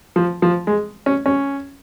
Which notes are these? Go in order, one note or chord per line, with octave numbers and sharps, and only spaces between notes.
F3
F3
G#3
C#4
C#4